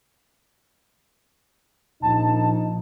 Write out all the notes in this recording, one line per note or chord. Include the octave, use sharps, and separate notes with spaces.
A#1 D#4 A5